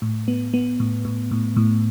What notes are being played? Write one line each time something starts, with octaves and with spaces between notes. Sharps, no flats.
A2
B3
B3
A2
A2
A2
A2